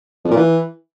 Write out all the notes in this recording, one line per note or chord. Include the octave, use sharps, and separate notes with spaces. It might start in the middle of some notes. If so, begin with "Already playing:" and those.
F2
A#2
E3